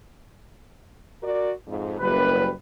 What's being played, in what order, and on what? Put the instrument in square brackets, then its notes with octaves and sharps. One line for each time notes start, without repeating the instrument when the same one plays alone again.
[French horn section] F#4 A#4 D5
F2 G#2
[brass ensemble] F#1 B4 [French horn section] F#2 G3